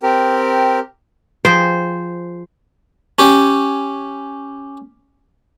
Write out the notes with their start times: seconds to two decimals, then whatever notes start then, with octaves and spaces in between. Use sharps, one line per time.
0.03 C4 G4 A#4
1.45 F3 G#4 C5 G5
3.19 C#4 G4